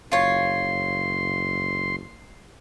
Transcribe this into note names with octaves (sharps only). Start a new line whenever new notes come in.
F#1 F4 C#5 C6